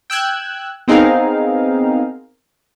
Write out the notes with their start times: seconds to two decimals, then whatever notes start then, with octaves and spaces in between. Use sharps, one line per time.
0.10 G5 E6 F#6 G#6
0.88 B3 C4 D#4 G#4 A#4 F5